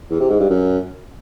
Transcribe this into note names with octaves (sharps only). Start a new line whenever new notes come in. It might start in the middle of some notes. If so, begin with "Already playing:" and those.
E2
C3
G#2
G2
F#2